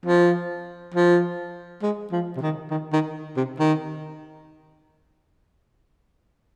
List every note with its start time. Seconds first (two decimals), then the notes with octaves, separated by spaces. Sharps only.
0.06 F3
0.94 F3
1.83 G#3
2.12 F3
2.37 C3
2.41 D#3
2.71 D#3
2.93 D#3
3.37 C3
3.60 D#3